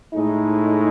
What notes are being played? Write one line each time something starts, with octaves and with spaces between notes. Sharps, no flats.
A2 G#3 D#4